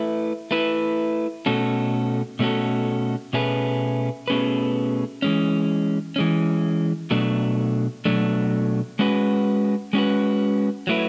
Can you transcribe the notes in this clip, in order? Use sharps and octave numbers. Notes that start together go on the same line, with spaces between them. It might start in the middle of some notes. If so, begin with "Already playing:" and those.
Already playing: A3 E4 B4
A3 E4 B4
B2 A3 C#4 F#4 A4
B2 A3 C#4 F#4 A4
B2 A3 C#4 G#4 B4
B2 A3 C#4 G#4 B4
E3 G#3 C#4
E3 G#3 C#4
B2 F#3 A3 D4
B2 F#3 A3 D4
G#3 C#4 F#4 B4
G#3 C#4 F#4 B4
F#3 A3 E4 B4